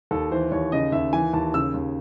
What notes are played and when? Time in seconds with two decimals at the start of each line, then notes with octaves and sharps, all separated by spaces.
0.11 D#2 A4
0.31 E3 C5
0.52 D#2 C#5
0.72 C#3 D#5
0.92 D#2 E5
1.13 E3 G#5
1.33 D#2 A5
1.54 C#3 E6
1.74 D#2